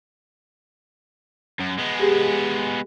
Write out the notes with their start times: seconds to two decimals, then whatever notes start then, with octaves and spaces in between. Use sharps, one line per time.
1.59 F#2
1.78 G#3 B3
2.00 G4 G#4